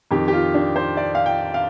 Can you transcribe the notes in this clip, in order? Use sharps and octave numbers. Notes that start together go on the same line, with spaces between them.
F2 D#3 G4
G4
F4
D4
C5
D5
F5
G5
F5